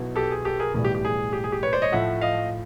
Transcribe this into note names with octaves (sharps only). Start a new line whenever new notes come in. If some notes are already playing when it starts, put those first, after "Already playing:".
Already playing: B1 B2 F#3 B3 E4
G4 A4
G#4
G4 A4
G#4 A#4
B1 A2 E3 G3 G#4
G4
G4
G#4
G4
G#4
G4
B4 C#5
C5 D5
C#5 D#5
A2 F3 A3 E5 F#5
D#5 F5